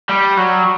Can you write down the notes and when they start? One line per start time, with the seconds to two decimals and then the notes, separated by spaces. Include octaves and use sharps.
0.09 G3
0.37 F#3